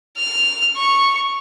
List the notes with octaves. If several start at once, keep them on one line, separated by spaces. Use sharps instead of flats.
F6
C#6